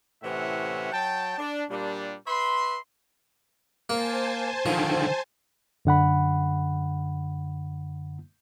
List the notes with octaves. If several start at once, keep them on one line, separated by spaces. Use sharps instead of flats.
A2 C3 E3 C#4 E5 F#5
F#3 G5 A5
D4
A#2 G3 D4
B4 E5 B5 C6
A#3 C5 G#5 A5
D3 D#3 F3
F#2 D3 F#5 B5